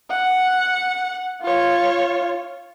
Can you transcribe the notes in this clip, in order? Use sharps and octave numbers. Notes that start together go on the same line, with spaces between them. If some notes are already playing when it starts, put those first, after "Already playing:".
F#5
F4 C#5